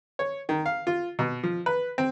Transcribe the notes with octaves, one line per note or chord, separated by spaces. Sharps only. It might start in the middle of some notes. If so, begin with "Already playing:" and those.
C#5
D#3
F5
F4
B2
F3
B4
C4